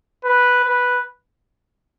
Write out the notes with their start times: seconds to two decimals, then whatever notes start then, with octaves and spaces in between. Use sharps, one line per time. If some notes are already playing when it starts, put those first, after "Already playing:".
0.24 B4
0.65 B4